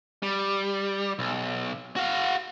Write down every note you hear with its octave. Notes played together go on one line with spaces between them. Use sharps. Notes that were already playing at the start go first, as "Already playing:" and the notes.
G3
B1
F#4 F5